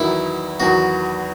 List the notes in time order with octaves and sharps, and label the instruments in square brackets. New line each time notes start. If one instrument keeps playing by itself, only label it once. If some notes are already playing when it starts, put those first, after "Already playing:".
Already playing: [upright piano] E2 D#3 F#3 B3 [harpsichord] E4
[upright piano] E2 D#3 F#3 B3 [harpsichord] F#4